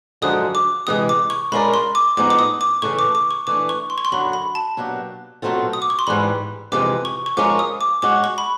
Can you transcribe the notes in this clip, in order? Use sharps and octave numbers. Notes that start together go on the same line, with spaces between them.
F#2 D3 F3 G#3 D#6
D6
C3 E3 G#3 D#6
D6
C#6
G#3 C#4 F4 A#4 D5 B5
C6
D6
A2 F3 G#3 B3 D#4 D6
D6
D#6
D6
C#3 E3 A3 C#6
D6
D6
C#6
E3 A3 D4 D6
C#6
C6
C#6
C6
F#2 D3 F#3 B5
B5
A5
B2 F#3 A#3 D4 G4
B2 F#3 A3 C4 F4
D#6
D6
C#6
C6
G#2 E3 G3 B5
F2 C3 E3 G#3 D6
C#6
C#6
F3 G#3 C#4 F4 A#4 D6
D#6
D6
G#3 C#4 F#4 D6
C#6
B5